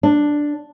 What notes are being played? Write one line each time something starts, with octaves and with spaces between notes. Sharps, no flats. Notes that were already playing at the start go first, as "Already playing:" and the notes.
D4